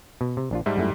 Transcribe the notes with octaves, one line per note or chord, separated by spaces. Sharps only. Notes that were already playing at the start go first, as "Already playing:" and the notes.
B2
C3
A#1 D4 F4
G#2 G3 E5 A5
F#2 A3 E4